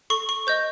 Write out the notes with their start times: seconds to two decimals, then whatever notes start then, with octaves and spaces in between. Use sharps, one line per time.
0.10 A4 C#6
0.29 C#6
0.47 C5 D#5 G6